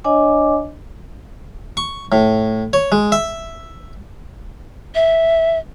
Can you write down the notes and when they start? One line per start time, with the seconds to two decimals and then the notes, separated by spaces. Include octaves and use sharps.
0.04 D4 C#5 D#5 G#5 D6
1.77 C#6
2.12 A2
2.73 C#5
2.92 G#3
3.12 E5
4.95 E5